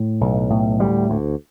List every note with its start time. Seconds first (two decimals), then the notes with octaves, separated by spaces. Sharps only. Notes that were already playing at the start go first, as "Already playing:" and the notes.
Already playing: A2
0.21 B1
0.50 A2
0.80 D2 G3
1.10 D2